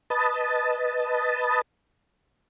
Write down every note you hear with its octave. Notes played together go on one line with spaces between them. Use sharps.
B4 D#5 A5